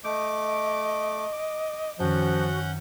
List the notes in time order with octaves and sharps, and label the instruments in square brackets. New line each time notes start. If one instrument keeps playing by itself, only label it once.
[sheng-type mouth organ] A3 D6 [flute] D#5 [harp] D#6 G6 D7
[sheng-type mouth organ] D6
[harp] F#2 D#3 [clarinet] F3 [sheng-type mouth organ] C#4 F#5 G6 [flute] F#4